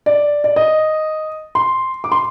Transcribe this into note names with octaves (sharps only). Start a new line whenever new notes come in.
D5
D5
D#5
C6
D6
C6